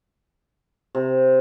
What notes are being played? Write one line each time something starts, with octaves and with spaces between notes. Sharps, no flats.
C3